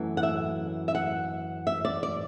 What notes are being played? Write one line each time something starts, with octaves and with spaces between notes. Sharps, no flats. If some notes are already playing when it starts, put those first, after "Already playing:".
Already playing: F#2 E3 A3
F#5
E5
E5
F#5
E5
D5
D5